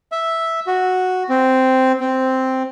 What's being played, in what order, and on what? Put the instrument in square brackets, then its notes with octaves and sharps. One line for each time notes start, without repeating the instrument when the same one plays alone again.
[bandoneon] E5
F#4
C4
C4